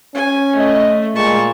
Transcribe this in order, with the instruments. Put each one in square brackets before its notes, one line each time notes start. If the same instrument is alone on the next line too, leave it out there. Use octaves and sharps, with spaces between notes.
[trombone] C#4 [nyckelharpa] G#5
[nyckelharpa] A3 [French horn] D#5
[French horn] A#2 [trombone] G#3 [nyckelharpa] A5 C#6